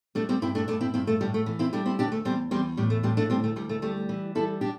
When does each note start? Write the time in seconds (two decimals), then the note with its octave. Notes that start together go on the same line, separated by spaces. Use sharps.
0.15 G3 A3 D4
0.29 G3 C4
0.42 G2 C4 E4
0.55 A3 D4
0.68 G2 A3 D4
0.81 C4 E4
0.94 G2 C4 E4
1.07 A3
1.21 A2 G3
1.34 A3
1.46 E3
1.59 C4 E4
1.73 G3 A3 D4
1.86 C4 E4
1.99 D2 D4 G4
2.12 A3
2.25 E2 G3 C4
2.51 E2 G3 C4
2.77 A2 G3
2.90 A3
3.03 A2 G3 C4
3.17 A3 D4
3.30 D2 G3 C4
3.44 A3
3.56 D2 G3
3.69 A3
3.82 G3 A3
4.09 E3
4.35 G3 E4 A4
4.61 D4 G4